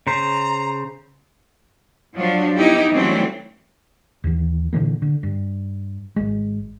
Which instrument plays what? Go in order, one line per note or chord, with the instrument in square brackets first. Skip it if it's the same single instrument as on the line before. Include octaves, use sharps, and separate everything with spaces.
[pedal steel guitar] C#3 C5 [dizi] A#5
[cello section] F3 F#3 D4
B3 D#4 E4 G4
E3 F#3 G3 A3 C4 C#4
[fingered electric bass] D#2 E3
A#2 D3 E3 A#3
D3
G2
G#1 G#3